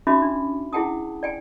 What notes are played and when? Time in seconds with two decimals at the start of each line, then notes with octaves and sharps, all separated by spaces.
0.07 C#4 D#4 F#4 E5 B5 D6
0.22 D4
0.73 E4 G#4 F#5 G5 A5 D#6
1.23 D5 G5 G#5